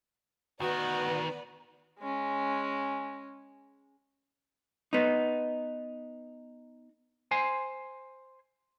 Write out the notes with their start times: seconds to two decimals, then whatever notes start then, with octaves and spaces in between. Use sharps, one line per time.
0.60 D2 D#3 B3 F#4 B4 D5
1.99 G#3 C#4
4.93 B3 D#4
7.31 C5 G#5 C6